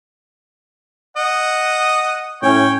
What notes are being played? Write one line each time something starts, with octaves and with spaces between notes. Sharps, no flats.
D#5 F#5
A2 C#4 C#5 G5